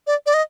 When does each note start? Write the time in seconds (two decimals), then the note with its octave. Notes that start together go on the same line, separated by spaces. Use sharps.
0.07 D5
0.26 D5
0.34 D#5